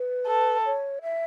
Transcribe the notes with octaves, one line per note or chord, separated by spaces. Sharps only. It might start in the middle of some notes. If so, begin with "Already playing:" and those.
Already playing: B4
A4
C#5
E5